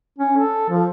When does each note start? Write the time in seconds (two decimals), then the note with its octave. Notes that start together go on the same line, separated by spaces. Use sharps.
0.18 C#4
0.37 A4
0.69 F3